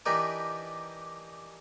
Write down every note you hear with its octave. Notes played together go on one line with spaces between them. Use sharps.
E3 D4 D#4 G4 A#4 B4